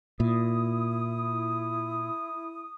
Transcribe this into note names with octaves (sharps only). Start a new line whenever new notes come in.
A#2 E4 D#6